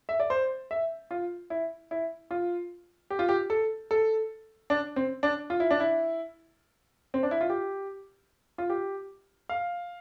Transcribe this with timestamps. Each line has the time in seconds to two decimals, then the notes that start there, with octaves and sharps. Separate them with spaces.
0.09 E5
0.20 D5
0.30 C5
0.71 E5
1.11 F4
1.50 E4
1.91 E4
2.31 F4
3.10 G4
3.19 F4
3.29 G4
3.50 A4
3.91 A4
4.70 D4
4.96 C4
5.23 D4
5.50 F4
5.60 E4
5.71 D4
5.80 E4
7.14 C4
7.23 D4
7.31 E4
7.41 F4
7.50 G4
8.58 F4
8.70 G4
9.49 F5